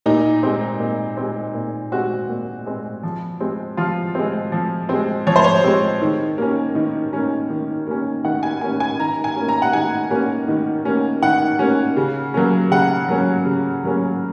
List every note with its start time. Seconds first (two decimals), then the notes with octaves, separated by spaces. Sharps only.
0.06 A#2 D#4
0.43 G#3 C4
0.80 A#2
1.17 G#3 C4
1.54 A#2
1.92 G#3 C4 F#4
2.29 A#2
2.66 G#3 C4
3.03 F3
3.40 G#3 C4
3.77 F3 F4
4.15 G#3 C4
4.52 F3
4.89 G#3 C4
5.27 F3 C#5
5.36 C5
5.44 C#5
5.64 G#3 C4
6.02 D#3
6.38 A#3 C#4
6.75 D#3
7.13 A#3 C#4
7.50 D#3
7.87 A#3 C#4
8.25 D#3 F#5
8.43 G#5
8.61 A#3 C#4 G#5
8.80 G#5
8.99 D#3 A#5
9.24 G#5
9.36 A#3 C#4
9.48 A#5
9.62 F#5
9.73 D#3 G#5
10.10 A#3 C#4
10.48 D#3
10.85 A#3 C#4
11.22 D#3 F#5
11.59 A#3 C#4
11.97 C#3
12.34 F#3 A#3 C#4
12.71 C#3 F#5
13.08 F#3 A#3 C#4
13.45 C#3
13.83 F#3 A#3 C#4